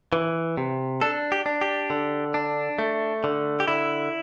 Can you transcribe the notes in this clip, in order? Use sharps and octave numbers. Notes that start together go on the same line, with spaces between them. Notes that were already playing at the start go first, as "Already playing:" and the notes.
E3
C3
D4 A4
G4
D4
G4
D3
D4
A3
D3
G4
D3 E4